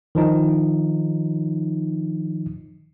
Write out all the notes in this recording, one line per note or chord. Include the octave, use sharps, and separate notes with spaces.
D#3 F3 D#4